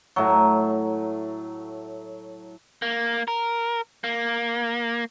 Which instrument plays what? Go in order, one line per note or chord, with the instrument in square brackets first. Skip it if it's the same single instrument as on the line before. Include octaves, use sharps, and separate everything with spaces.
[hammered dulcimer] A2 F#3
[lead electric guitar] A#3
A#4
A#3